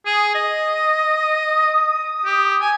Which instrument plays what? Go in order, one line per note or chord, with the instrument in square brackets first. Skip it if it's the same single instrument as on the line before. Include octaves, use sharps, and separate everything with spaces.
[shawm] G#4 [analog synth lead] D#6
[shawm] D#5
G4
[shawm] G#5 [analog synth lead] G#6